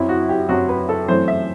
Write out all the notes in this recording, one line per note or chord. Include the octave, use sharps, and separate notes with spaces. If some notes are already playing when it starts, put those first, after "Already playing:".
Already playing: F#2 F#3 C4 E4
F#4
G4
F#2 F#3 C4 F#4
B4
A4
F#2 E3 A3 C4 C5
E5